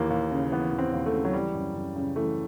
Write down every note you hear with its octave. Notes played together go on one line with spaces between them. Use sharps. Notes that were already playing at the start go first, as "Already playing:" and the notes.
Already playing: D#2 E3 A#3
D#2
C#3
E3 B3
D#2
C4
D#2
A3
C#3
F#3
E3 G3
F#2
F#2
C#3
E3 A3